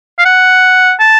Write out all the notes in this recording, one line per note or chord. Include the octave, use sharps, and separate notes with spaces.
F5
F#5
A5